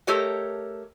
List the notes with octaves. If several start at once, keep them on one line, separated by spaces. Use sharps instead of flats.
A3 G4 A4 A#4 C#5 D#5